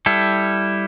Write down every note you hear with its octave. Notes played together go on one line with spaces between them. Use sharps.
G3 E4 A4